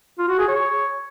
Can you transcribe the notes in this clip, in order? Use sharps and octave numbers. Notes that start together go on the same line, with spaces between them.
F4
F#4
G#4
C#5